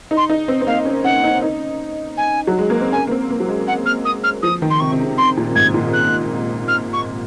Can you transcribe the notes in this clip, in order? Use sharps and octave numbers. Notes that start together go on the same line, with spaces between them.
D#4
C6
D#4
C4
C4
A#3 F5
C#4
C#4 F#5
D#4
D#4
G#5
F#3
G#3
A#3
C4
C#4 G#5
A#3
C4
A#3
F#3
G#3
F#5
F6
D#6
F6
F3 D#6
D#3
C6
C3 C#6
C3
C#3
C3 C6
A#2
G#2 G#6
A#2
F#6
F6
C#6